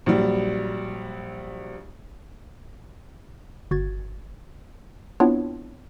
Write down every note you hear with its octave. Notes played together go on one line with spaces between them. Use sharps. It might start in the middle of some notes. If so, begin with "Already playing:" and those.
A#1 F#3 G3
G1 F#4 G#6 A6
B3 C4 D4 E4 F4 C#5